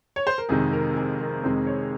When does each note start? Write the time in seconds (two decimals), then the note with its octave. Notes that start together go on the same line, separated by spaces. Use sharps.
0.16 C#5
0.27 C5
0.38 A#4
0.49 F2 C3 D#3 G#3 G#4
0.73 A#4
0.96 G#4
1.20 A#4
1.43 F2 C3 D#3 G#3 C5
1.67 C#5